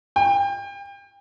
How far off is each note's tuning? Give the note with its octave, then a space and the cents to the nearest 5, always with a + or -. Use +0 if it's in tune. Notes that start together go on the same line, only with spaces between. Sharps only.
G5 +30